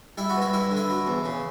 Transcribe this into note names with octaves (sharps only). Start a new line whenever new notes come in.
G3 E4
F#4
G2
E4
G2 E4
D3
E4
F#3
E2
C#3